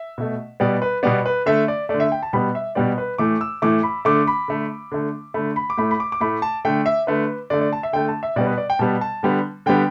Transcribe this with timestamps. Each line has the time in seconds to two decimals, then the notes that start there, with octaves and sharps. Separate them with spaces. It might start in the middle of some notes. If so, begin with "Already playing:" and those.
Already playing: E5
0.18 B2 A3
0.60 B2 G3 B3 D5
0.82 B4
1.03 B2 G3 B3 D5
1.26 B4
1.46 D3 A3 E5
1.68 D5
1.89 A3 D5
1.94 D3
2.00 E5
2.12 G5
2.23 A5
2.33 B2 G3 B3 B5
2.55 E5
2.75 B2 G3 B3 D5
2.98 B4
3.18 A2 E3 A3 D6
3.41 E6
3.62 A2 E3 A3 D6
3.83 B5
4.05 D3 A3 D6
4.27 B5
4.48 D3 A3
4.92 D3 A3
5.34 D3 A3 B5
5.56 B5
5.70 D6
5.77 A2 A3 B5
5.91 B5
6.00 D6
6.12 D6
6.20 A2 A3 B5
6.42 A5
6.65 D3 A3 G5
6.86 E5
7.07 D3 A3 B4
7.50 D3 A3 D5
7.61 D5
7.73 A5
7.83 E5
7.93 D3 A3 G5
8.08 A5
8.23 E5
8.36 B2 G3 B3 D5
8.47 B4
8.58 D5
8.70 G5
8.79 B2 G3 B3 A5
9.01 A5
9.23 D3 G3 B3
9.66 D3 G3 B3 G5